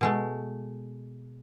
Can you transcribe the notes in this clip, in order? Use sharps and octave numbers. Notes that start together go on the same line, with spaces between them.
B2 G#3 A3